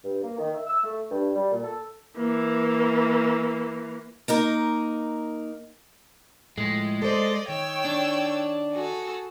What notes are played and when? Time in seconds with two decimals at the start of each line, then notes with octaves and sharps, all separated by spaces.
0.03 G2
0.22 A#3
0.39 D#3
0.54 E5
0.66 E6
0.83 A3
1.11 G2
1.35 G3
1.52 A#2
1.64 A4
2.17 E3 A#3
4.28 A#3 D#4 A#4
6.58 A2 F3 G#3 A3
7.02 A4 C5 D5 D#5
7.49 D#3 C#5 G5 E6
7.85 D4
8.72 F#4 G#4 A4